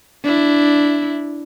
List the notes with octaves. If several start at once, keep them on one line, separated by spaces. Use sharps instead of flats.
D4 E4